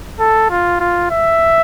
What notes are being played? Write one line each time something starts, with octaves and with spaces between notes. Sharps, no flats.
A4
F4
F4
E5